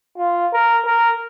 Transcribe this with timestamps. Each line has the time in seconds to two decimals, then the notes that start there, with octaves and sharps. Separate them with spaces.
0.17 F4
0.53 A#4
0.85 A#4